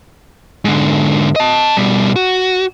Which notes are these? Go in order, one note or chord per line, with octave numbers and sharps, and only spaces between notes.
G#2 D3
D#5 A5
B2 G3
F#4